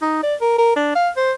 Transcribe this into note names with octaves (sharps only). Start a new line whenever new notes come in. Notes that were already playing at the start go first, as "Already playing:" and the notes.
D#4
D5
A#4
A#4
D4
F5
C5